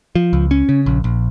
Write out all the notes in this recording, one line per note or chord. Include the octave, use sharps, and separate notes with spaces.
F3
C#2
C#4
C#3
A#1
A#1